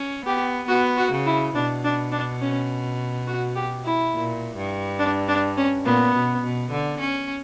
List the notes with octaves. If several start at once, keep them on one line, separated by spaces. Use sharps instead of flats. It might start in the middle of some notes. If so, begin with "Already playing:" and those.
Already playing: C#4
B3 G4
B3 F#4
F#4
C#3
E4
B2 D4
D4
D4
C#4
F#4
G4
E4
A#2
G2
D4
D4
C#4
A#2 B3
B2
B2
D3
C#4